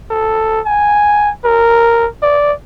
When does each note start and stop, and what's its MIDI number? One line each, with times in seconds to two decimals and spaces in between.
0.11 0.60 69
0.66 1.31 80
1.45 2.07 70
2.23 2.52 74